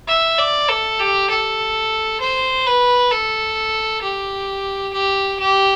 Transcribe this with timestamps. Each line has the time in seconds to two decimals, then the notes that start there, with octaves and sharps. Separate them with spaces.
0.08 E5
0.39 D5
0.69 A4
1.00 G4
1.30 A4
2.20 C5
2.66 B4
3.11 A4
4.02 G4
4.93 G4
5.39 G4